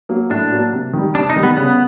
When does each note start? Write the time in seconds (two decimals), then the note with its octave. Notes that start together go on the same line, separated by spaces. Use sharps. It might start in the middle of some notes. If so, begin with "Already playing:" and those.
0.09 F#3 A#3
0.30 A2 D4
0.52 F#3 A#3
0.73 C3
0.93 D#3 G3
1.15 C3 D4
1.30 D#4
1.36 D#3 G3
1.43 B3
1.57 C#3 B3